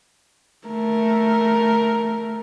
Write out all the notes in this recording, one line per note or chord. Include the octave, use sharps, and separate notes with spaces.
A3 A#4